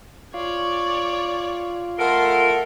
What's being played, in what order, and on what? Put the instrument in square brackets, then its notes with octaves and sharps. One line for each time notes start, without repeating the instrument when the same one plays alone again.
[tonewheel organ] F4 F5 [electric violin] C#5 D5
[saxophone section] A3 A4 A#4 [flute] F#5 [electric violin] C6